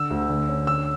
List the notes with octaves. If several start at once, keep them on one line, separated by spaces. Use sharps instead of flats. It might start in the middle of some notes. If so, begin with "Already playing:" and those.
Already playing: D3 E6
D2
D3
C#4
D3 E6